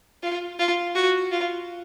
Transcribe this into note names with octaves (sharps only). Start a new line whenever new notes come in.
F4
F4
F#4
F4